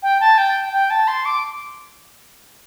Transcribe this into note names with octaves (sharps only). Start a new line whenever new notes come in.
G5
A5
G5
G5
A5
C6
D6